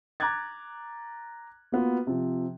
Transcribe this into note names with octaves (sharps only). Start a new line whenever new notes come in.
A#5 D6 F#6 G#6 A6
A#3 B3 F4 F#4
C3 F3